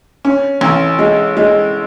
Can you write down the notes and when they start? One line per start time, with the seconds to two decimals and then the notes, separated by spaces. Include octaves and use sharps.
0.25 C#4
0.61 A1
0.99 G#3
1.37 G#3